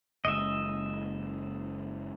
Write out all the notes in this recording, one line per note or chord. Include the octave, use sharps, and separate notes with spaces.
F#1 G#3 D#5 E5